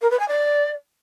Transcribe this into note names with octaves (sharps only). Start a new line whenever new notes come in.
A#4
B4
G#5
D5